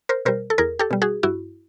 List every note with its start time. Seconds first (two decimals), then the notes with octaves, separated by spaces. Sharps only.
0.09 A#4 C5
0.25 B2 G3 A#4 C5
0.50 A4
0.58 E2 G#4 A#4
0.79 G4 A4
0.91 B2 G3
1.02 F#4 G#4
1.23 G2 E4 F#4